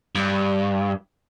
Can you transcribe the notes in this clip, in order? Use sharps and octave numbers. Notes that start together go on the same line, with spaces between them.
G2